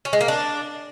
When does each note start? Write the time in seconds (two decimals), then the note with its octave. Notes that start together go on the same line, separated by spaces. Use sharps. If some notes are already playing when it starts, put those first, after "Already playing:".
0.05 C#4
0.13 G#3
0.21 A#3
0.28 D4